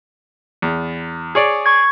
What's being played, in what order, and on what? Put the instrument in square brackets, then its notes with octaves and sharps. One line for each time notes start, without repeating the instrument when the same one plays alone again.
[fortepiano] E2
G#4 C#5 D5
[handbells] C#6 G#6